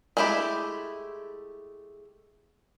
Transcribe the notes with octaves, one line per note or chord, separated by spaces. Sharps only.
G#3 A3 E4 G4 B5